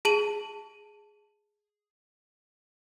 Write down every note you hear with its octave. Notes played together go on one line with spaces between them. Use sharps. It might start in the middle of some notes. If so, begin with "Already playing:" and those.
G#4 A5 D#7 F#7